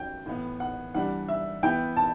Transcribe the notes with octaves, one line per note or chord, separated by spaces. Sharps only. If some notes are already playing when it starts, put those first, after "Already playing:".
Already playing: F#3 C#4 G5
A2 E3 B3
F#5
E3 G3 D4 F#5
E5
E3 B3 E4 G5
A5